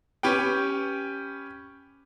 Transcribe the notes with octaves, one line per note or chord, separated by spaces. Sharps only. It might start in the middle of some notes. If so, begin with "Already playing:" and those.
C#4 G4 B4 G5